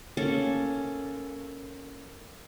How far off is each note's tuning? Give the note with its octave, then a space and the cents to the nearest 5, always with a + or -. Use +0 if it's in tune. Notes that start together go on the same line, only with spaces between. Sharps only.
A#3 +0 C#4 +0 A4 +0